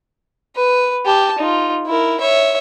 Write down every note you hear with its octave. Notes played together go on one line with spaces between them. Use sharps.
B4
G4 A5
D#4 F4
E4 A#4
C#5 E5